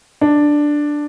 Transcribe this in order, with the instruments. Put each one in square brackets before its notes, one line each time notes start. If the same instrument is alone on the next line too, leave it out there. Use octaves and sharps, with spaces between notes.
[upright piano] D4